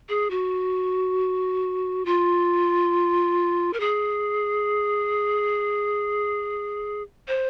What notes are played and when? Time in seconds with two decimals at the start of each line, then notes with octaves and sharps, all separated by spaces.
0.09 G#4
0.30 F#4
2.05 F4
3.73 A#4
3.80 G#4
7.28 C5